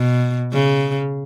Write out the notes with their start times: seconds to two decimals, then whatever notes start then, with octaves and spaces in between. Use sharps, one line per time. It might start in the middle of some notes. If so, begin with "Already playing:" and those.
Already playing: B2
0.53 C#3